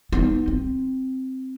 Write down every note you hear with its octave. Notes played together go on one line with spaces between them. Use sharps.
B3 D#4
C4